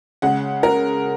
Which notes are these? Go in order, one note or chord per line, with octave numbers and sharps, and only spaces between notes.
C#3 G#3 F#5
A#4